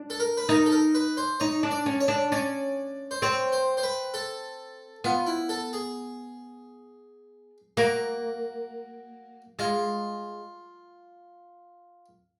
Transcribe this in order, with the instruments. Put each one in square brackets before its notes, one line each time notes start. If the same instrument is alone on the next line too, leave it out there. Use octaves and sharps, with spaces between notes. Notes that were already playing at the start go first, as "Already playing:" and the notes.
Already playing: [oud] D4
[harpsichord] A4
A#4
B4
[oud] D#4 [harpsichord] A#4
[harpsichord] A4
A#4
B4
C5
[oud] D#4 [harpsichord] C#5
[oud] D4
[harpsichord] D5
[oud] C#4
[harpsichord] C#5
[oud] D4
[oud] C#4 [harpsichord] D5
[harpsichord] C5
[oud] C4 [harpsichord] C#5
[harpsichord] C5
C5
B4
A4
[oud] B3 [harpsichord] F4
[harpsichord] E4
A4
G#4
[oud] A#3 [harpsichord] F#4
[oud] G#3 [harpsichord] F4